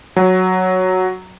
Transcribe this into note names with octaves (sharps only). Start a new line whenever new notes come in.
F#3